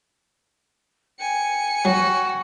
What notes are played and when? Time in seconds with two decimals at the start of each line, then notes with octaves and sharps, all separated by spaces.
1.19 G5 G#5 C#7
1.85 F#3 F#4